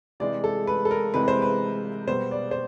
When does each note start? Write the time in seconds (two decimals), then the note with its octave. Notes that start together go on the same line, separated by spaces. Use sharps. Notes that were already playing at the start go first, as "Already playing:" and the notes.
0.20 C3 E3 G#3 C4 D5
0.44 A4
0.67 B4
0.85 A4
0.91 A#4
1.14 C3 E3 G#3 C4 B4
1.28 C5
1.42 B4
2.07 B2 G3 B3 C5
2.31 D5
2.51 C5